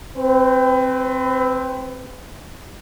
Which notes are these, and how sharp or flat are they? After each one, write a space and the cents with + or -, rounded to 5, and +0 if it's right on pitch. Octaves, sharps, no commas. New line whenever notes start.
C4 +0 B4 +35